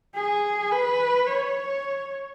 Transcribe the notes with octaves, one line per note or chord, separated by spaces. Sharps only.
G#4
B4
C#5